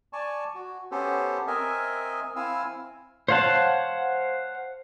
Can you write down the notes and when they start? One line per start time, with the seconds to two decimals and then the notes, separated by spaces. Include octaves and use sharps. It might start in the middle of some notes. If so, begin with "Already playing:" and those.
0.13 D5 G#5 A5 C#6
0.55 F#4
0.91 B3 C#4 G4 A4 C5
1.47 C4 A#4 D#5 E5 G#5
2.36 C4 E4 F5 G#5 E6
3.28 C5 C#5 F5 F#5 A5